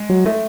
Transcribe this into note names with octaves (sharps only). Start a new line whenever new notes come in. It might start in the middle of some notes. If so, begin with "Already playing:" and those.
Already playing: G#3
F#3
A3